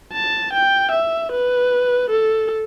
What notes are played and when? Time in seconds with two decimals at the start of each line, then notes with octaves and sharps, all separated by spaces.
0.13 A5
0.53 G5
0.92 E5
1.32 B4
2.10 A4